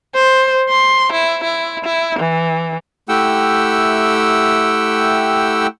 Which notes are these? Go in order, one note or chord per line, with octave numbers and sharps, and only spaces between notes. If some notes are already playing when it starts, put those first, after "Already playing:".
C5
C6
E4
E4
E4
E3
A3 E4 G4 F#5 G5 E6